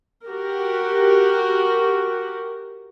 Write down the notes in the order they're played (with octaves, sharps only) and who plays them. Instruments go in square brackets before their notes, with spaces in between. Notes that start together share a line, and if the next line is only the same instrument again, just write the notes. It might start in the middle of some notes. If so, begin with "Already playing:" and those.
[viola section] F#4 G4 A#4